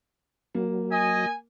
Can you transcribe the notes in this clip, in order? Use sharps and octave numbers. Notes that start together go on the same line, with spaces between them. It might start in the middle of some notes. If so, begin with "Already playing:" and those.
F#3 A#3
D#5 G#5